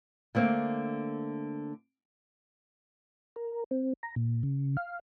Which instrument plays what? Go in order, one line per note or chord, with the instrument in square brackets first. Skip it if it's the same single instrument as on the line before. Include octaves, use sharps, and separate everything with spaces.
[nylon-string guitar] D3 A3 A#3 C4
[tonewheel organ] A#4
C4
A#5
A#2
C#3
F5